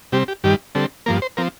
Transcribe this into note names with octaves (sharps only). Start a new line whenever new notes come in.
C3 G3 C4 G4
G4
G2 D#3 G3 G4
D3 G3 C4 A4
G2 F3 A#3 A#4
C5
F3 C4 A#4